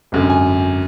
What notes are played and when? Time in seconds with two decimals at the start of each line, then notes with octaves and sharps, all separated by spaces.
0.12 G#1 F#2 D3
0.30 G#5